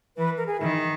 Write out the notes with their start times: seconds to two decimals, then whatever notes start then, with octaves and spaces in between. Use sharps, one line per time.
0.17 E3 B4
0.37 A#4
0.46 G#4
0.61 D#3 E4